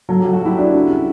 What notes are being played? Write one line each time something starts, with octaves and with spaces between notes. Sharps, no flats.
F#3 A4
F#3 G4
F#4
F#3 E4 G4
D4
C#3
G3